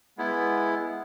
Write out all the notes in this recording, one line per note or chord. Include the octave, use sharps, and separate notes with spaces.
G#3 B3 E4